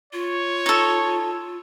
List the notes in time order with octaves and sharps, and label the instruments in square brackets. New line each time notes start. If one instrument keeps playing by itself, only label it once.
[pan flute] F4 [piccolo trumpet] C#5
[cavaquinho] D#4 A4